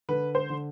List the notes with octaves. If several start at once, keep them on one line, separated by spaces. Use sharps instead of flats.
D3 B4
C5
D3